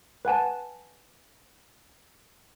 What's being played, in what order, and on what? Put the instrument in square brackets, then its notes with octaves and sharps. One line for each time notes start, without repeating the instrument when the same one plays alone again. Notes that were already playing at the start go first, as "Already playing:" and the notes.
[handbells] B4 F#5 G#5 A5